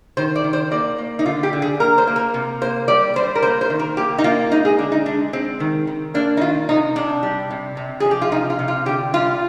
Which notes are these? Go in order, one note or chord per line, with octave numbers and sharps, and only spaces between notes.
D#3 C5
D5
D#3
C5
A#3 D5
A#3
D#4
D3 F4
G4
D3
G#4
A#3 A#4
C5
A#3
A#4
C3
A#3 C5
G3 D5
G3 C5
A#4
A#3 C5
C5
D#3
A#4
A#3 G4
D#4
A#3 F4
G#3 D#4
G#4
D3 D4
D#4
G#3 D4
G#3 C4
D#3
D#3
A#3 D4
D#4
D#3 F4
C3 D#4
C3 D4
G3
C3
C3
F3 G#4
G4
F4
C3 D#4
F4
C3
F4
D3 G4
G3 F4